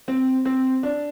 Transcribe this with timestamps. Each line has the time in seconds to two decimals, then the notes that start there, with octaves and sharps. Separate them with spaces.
0.08 C4
0.45 C4
0.83 D4